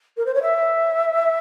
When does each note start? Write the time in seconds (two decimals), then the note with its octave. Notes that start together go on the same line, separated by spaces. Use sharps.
0.17 A#4
0.26 C5
0.34 C#5
0.42 E5